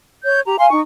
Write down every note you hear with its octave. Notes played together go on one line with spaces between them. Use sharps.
C#5 G6
G4 A#5
F5 G#5 C6
D#4 C#6